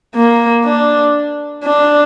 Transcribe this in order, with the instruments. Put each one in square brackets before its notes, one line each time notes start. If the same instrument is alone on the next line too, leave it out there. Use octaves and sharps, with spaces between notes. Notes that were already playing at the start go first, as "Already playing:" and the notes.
[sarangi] A#3
D4
D4